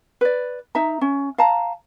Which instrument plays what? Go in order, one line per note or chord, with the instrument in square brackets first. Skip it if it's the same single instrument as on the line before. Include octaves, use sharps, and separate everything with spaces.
[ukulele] B4 D5
D#4 E5 A#5
C#4
F5 A5 A#5